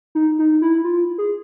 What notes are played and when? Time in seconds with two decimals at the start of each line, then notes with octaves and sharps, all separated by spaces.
0.15 D#4
0.39 D#4
0.62 E4
0.84 F4
1.18 G#4